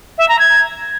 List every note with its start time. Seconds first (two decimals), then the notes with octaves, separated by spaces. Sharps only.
0.18 E5
0.28 A#5
0.39 G#6